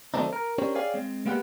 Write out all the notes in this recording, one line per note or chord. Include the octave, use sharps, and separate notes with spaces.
D#3 F#3 A3 C4 D4 D#4
A#4
C#4 D4 G4 A#4 C5 C#5
G#4 C#5 D5 F5 G5 G#5
G#3 C4
G#3 A#3 B3 G4 D#5 F#5